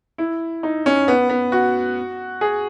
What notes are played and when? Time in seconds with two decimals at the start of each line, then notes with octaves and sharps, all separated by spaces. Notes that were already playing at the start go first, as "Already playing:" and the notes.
0.18 E4
0.63 D#4
0.86 C#4
1.08 B3
1.30 B3
1.52 F#4
2.41 G#4